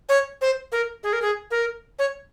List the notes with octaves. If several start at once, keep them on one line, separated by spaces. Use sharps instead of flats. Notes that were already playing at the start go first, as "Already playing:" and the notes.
C#5
C5
A#4
G#4
A#4
G#4
A#4
C#5